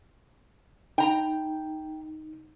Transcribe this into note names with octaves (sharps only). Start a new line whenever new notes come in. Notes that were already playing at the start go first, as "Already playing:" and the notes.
D#4 G5 A#5